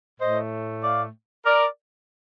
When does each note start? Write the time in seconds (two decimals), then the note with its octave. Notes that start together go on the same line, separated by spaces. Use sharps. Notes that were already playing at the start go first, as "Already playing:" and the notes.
0.19 A2 A3 C5 D#5
0.83 D5 F5
1.46 A#4 D5